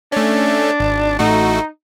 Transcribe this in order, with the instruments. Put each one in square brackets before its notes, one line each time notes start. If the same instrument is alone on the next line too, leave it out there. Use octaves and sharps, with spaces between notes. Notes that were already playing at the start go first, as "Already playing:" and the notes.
[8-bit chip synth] A3 C#4 [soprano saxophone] D4
[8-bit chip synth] G#1
[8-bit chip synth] A1 A3 F#4 [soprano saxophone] D#4